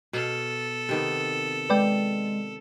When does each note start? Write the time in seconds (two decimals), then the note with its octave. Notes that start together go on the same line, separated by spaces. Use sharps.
0.13 B2 A4 F5
0.89 C3 D#3 B3
1.70 G#3 B4 D5 G5